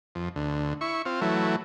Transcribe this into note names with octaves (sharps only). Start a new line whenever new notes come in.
F2
D2
E4 C#6
C4 F4
E3 F#3 A3